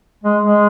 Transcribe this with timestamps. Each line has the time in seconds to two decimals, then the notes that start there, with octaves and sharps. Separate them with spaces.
0.24 G#3
0.42 G#3